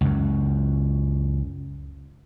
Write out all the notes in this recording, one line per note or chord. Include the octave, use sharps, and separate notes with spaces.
C#2 F#2